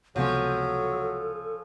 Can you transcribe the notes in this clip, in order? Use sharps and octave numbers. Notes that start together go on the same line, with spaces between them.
C#2 C3 F3 F#3 B3 C#4 A4